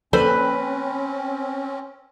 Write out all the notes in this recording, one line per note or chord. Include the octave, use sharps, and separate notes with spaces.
F3 A#3 C4 C#4 A4 B4 C5 D5